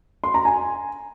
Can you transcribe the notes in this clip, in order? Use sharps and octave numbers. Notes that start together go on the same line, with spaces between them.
C6
A#5
G#5